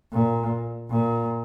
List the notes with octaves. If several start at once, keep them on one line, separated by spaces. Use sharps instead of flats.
A#2
A#2